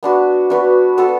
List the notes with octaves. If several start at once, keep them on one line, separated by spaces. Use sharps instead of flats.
B3 D4 F#4 B4
B3 D4 F#4 B4
B3 F#4 A4